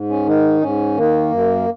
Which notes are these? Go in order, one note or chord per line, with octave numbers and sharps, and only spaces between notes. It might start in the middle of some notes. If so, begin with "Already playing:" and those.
Already playing: G#2
C#4
D#3 D#4
G#2 C#4
D#3 A#3
F#2